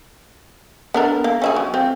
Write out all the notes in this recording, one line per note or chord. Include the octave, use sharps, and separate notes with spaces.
B3 D4 A#4
A#3
C#4 E4 G#4
F#3
C4 F4